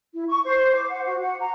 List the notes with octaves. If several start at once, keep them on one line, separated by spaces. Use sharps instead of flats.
E4
C#6
C5
D6
F#5
F#4
F#5
A#5